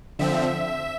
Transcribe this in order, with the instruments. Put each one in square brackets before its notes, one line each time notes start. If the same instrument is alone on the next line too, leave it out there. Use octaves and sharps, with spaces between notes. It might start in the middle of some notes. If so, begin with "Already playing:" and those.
[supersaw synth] D3 F3 C4 E5